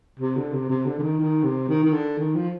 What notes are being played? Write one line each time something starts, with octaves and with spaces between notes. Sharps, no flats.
C3
D3
C3
C3
D3
D3
D#3
D#3
C3
D#3
D#3
D3
D#3
F3